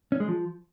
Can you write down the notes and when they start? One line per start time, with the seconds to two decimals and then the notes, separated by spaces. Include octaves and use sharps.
0.12 C#4
0.20 G#3
0.28 F3